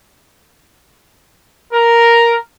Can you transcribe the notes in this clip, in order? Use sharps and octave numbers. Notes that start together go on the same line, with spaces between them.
A#4